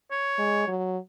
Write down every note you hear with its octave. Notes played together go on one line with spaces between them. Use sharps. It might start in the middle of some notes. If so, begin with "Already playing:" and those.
C#5
G#3
F#3